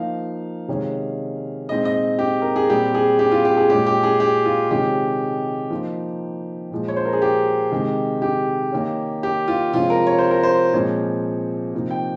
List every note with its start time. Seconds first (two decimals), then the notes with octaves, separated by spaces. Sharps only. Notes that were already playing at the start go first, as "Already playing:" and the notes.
Already playing: F3 A#3 D#4 F5
0.68 C3 D#3 G#3 C#4
1.69 A#2 G#3 C4 D#4 D#5
1.85 D#5
2.19 G4
2.42 A#4
2.56 G#4
2.69 A#2 G3 C4 G4
2.95 G#4
3.19 G4
3.32 F4
3.45 G4
3.57 G#4
3.70 A#2 G#3 C#4 G4
3.86 G4
4.03 G#4
4.20 G4
4.45 F4
4.70 C3 D#3 G#3 C#4 G4
5.70 F3 A#3 D#4
6.71 A#2 F3 G#3
6.88 C#5
6.96 C5
7.05 A#4
7.13 G#4
7.22 G4
7.72 C3 D#3 G#3
8.22 G4
8.72 D#3 A#3 C#4
9.23 G4
9.48 F4
9.73 C3 F3 G#3 C#4 F4
9.90 A#4
10.07 C#5
10.18 C5
10.31 A#4
10.43 C5
10.73 A#2 F3 G#3 C4 C#5
11.74 C3 F3 A#3 D#4
11.91 G5